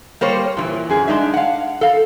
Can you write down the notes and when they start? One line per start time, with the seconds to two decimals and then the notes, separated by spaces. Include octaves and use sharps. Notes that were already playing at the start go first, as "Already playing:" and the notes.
0.21 G3 A#3 C5 C#5
0.57 A#2 D#3 E3
0.90 F#2 G#4
1.08 G#3 D4 D#4 E5
1.34 F5 F#5
1.81 A4 F5